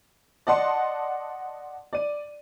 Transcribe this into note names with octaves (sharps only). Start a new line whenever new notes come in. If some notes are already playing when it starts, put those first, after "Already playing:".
D5 D#5 F#5 A5 C6
D5 D#7